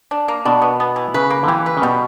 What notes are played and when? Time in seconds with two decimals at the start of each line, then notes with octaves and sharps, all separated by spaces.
0.11 D4
0.28 A#3
0.45 B2 D4
0.62 B3
0.80 B3
0.96 E3
1.14 C#3 B4
1.30 A#3
1.43 D3
1.48 E3 G4
1.66 B4
1.77 C#3
1.82 B2 G3